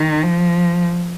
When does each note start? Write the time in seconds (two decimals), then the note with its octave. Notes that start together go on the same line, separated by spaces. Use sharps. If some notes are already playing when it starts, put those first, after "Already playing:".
Already playing: D#3
0.23 F3